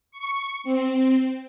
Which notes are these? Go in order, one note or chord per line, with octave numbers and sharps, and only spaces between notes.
C#6
C4